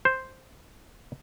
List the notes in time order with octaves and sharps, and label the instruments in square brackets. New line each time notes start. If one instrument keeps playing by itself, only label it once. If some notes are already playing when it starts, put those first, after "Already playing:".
[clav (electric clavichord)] C5